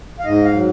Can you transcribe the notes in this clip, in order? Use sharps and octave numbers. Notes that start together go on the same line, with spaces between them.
F5
G#2 D#5
F5
F#3